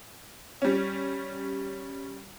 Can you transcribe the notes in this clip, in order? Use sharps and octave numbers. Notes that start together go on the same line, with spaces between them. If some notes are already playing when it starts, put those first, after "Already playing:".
G3 C#4